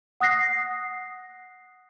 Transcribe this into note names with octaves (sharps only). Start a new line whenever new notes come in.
F#5 D#6 F#6 A#6 C7